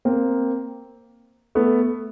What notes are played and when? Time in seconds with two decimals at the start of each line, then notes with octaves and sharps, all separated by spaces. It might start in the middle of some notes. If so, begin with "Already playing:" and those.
0.05 A#3 C4
1.55 A3 B3